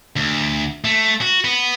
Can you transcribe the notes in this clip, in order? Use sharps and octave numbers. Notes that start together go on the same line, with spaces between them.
D2
A3
F#4
B3